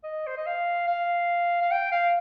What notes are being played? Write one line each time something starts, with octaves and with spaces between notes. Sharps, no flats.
D#5
C5
D#5
F5
F5
F5
G5
F5